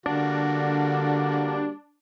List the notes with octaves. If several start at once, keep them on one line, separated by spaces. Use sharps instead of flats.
D3 G3 A#3 D4 F#4